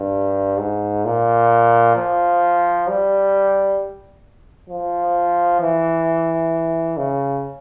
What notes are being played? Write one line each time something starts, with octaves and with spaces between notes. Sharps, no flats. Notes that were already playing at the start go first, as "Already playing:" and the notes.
Already playing: G2
G#2
A#2
F3
G3
F3
E3
C#3